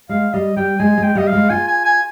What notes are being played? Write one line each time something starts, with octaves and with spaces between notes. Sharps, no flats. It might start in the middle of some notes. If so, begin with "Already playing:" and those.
G#3 F5
G3 D#5
G3 G5
G#3 G#5
G#3
G5
G3 D#5
F5
G#3
F4 G#5
G#5
G#5